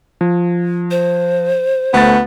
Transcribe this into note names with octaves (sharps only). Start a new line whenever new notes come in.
F3
C5
D2 A3 B3 A6